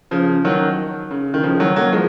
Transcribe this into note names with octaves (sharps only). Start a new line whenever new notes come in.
C#3 F3
D#3 F#3
C#3
D#3
C#3 F3
D#3 F#3
F#3 A#3
F3 G#3